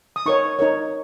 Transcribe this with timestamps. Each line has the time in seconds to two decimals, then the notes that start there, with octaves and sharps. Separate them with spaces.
0.16 D#6
0.26 D#4 A#4 C#5 C#6
0.59 D#4 A#4 C#5